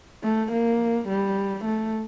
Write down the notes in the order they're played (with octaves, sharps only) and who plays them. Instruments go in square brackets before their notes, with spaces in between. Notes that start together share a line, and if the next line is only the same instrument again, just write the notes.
[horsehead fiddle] A3
A#3
G3
A3